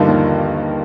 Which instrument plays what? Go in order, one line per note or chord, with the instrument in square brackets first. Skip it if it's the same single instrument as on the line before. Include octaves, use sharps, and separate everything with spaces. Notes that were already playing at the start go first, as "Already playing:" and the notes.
Already playing: [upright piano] G2 F3 A#3 D#4 [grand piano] D3
[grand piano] D#2 D#3